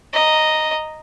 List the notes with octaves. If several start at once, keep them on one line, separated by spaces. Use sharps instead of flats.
D#5 A#5